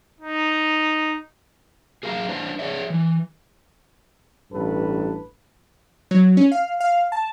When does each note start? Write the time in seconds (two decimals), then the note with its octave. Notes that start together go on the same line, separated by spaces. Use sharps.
0.21 D#4
2.03 G#4 A#4 F5 A5 A#5
2.29 D4 B4 C5
2.59 G#4 C#5 D5 E5
2.90 E3
4.52 A1 G2 A4 B4
6.11 F#3
6.37 C#4
6.52 F5
6.80 F5
7.12 A5